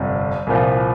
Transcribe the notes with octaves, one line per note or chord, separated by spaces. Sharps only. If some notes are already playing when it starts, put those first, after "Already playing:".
Already playing: G1 F2 C3
C2 A#2 F3